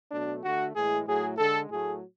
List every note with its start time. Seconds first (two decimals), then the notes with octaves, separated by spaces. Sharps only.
0.12 B2 F#3 A3 D4
0.44 D3 A3 F#4
0.75 A2 E3 G#3 G#4
1.06 A2 F#3 A3 G#4
1.38 D3 G#3 A4
1.70 A2 F#3 A3 G#4